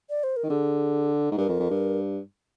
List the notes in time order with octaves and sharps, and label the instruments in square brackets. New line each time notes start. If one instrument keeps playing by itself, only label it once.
[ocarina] D5
C5
A#4
[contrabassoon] D#3
[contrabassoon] D3 [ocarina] G#4
[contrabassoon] G#2
[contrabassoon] G2 [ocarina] A#4
[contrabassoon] F2
F2
G2